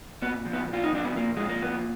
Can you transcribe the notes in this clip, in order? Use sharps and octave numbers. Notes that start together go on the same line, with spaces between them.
A#2 B3
F3
B3
A#2 F4
D#4
F3 D4
B3
A#2 A#3
F3 G#3
A#3
A#2 B3